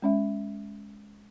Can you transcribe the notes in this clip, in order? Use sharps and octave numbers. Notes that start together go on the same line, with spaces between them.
G#3 C#4 E5